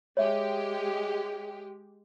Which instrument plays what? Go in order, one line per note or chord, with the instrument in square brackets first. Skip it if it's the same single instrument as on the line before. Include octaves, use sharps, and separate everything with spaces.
[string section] G#3 G4 [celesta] C#5 E5